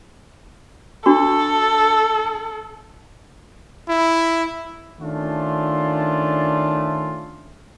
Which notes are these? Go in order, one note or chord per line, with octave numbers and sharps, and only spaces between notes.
D4 F#4 A4 C#6
E4
D#3 A3 C#4 D4 F4